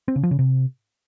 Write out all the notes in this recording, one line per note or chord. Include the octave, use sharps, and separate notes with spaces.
C4
C#3
F3
C#3
C3